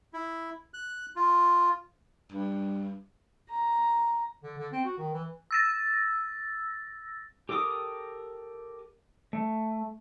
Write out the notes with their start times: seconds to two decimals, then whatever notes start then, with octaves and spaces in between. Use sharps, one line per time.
0.13 E4
0.74 F#6
1.16 F4
2.32 G2
3.50 A#5
4.43 D3
4.58 D3
4.72 C4
4.85 F#4
4.98 D#3
5.13 E3
5.51 E6 A6 A#6
7.49 G4 A4 A#4 D6 D#6
9.33 A3